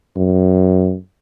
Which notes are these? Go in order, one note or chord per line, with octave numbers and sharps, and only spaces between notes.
F#2